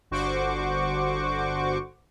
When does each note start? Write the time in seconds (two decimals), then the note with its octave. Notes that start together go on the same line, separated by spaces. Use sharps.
0.11 G1 D3 F#4 C5 C#6 D6